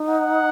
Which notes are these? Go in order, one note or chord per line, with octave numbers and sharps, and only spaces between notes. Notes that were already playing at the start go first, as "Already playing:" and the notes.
Already playing: D#4
F#5